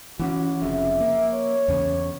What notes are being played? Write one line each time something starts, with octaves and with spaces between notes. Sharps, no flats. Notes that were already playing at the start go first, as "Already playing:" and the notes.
E3 C4 C#4 F#4
F1 F2 C#3 E5
A#3
C#5
E2 C#3